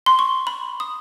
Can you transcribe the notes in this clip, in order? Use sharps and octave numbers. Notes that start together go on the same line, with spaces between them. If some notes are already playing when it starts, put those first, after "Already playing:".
C6
C#6
B5
D#6